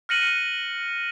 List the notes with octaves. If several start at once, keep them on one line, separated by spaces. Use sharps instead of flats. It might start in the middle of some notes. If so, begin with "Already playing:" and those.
F6 F#6 A#6 C#7 D#7 F#7